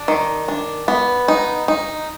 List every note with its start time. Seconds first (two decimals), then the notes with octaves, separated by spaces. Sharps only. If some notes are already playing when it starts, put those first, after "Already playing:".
Already playing: D4
0.08 D#3
0.48 D4
0.88 B3
1.28 D#4
1.68 D#4